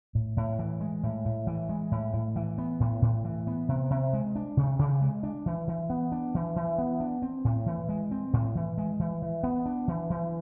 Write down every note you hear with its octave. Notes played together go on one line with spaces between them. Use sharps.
A2
A2
E3
G#3
A2
A2
E3
G#3
A2
A2
E3
B3
A2
A2
E3
B3
C3
C3
G#3
D4
C3
C3
G#3
D4
E3
E3
B3
D4
E3
E3
B3
D4
C4
A2
E3
G#3
C4
A2
E3
G#3
E3
E3
B3
D4
E3
E3